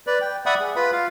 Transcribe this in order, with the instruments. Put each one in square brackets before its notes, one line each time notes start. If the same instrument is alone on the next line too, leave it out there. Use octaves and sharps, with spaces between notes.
[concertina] B4 D5
G5
D5 E5 F#5 B5 D#6
G#4
F4 B4 B5
F4 F5